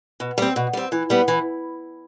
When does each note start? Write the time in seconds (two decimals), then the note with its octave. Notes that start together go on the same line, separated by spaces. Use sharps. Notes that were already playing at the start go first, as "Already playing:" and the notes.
0.20 B2
0.38 G3 C4
0.56 B2
0.73 G3 C4
0.92 E3
1.10 G3 B3
1.28 E3